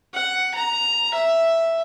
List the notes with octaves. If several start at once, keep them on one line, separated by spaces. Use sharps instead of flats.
F#5
A#5
E5